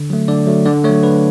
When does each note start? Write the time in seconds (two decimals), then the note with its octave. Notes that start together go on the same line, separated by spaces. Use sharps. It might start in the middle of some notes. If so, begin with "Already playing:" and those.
Already playing: D3
0.10 F#3 A3
0.28 D3 D5
0.47 F#3 A3
0.66 D3 D5
0.84 A3 C#5
0.89 F#3
1.03 D3 B4